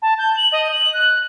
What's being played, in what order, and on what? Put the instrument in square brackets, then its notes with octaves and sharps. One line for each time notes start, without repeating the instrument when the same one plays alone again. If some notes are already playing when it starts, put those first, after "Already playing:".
[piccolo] A5
G6
F#7
D#5
F#7
F#6